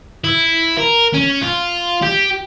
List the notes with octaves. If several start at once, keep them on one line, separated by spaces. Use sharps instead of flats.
E4
A#4
C#4
F4
G4